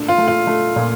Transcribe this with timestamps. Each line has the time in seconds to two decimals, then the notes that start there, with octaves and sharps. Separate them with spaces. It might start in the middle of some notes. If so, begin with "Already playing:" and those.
Already playing: A#2 A3 D4
0.08 F4
0.18 A3
0.28 F4
0.47 A3
0.76 A#2